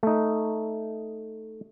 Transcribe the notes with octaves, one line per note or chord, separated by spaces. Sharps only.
A3 D#4